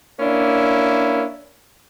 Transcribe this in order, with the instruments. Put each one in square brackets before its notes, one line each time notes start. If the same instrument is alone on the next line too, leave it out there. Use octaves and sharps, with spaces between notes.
[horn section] A#3 C#4 D4 E4